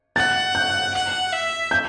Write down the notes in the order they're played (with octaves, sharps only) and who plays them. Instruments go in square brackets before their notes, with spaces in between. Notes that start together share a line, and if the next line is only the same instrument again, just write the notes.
[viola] F#5 [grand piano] A6
[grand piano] G6
[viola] F#5
E5
[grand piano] G6